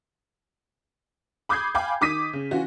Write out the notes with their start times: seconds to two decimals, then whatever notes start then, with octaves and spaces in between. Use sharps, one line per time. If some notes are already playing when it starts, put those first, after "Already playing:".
1.49 B5 D6 D#6 G6 G#6 C7
1.75 F5 G5 G#5 B5 D6
2.01 D#3 D6 D#6 B6 D#7
2.33 C#3
2.51 E3 C#4 F4 F#4